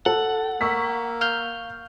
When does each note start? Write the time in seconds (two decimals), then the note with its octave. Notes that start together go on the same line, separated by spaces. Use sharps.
0.06 A4 F#5
0.61 A#3 C#6 E6 B6
1.21 F5 F6 G6